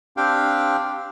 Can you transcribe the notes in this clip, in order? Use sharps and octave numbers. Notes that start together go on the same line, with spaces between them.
C4 D4 G4 F5 G5